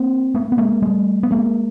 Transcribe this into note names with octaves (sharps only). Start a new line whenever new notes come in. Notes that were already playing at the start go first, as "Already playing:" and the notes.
Already playing: A#3 C4
A3 B3
B3
G#3 A#3
G3 A3
B3
G#3 A#3